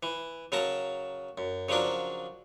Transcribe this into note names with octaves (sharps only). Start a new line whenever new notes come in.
E3
C#3 F#3 A#4 A5 A#5
F#2
C#3 F3 F#3 D4 A#4